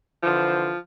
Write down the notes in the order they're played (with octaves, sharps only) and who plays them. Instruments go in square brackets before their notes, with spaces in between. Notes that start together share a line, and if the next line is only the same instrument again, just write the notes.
[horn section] D3 E3 C5 [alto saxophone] F3